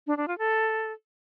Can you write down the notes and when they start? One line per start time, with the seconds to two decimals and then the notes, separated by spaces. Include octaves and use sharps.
0.07 D4
0.17 D4
0.28 F4
0.38 A4